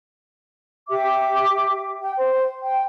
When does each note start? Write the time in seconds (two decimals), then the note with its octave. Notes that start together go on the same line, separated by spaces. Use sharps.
0.89 G4 E5 D6
2.02 G5
2.17 C5
2.63 G5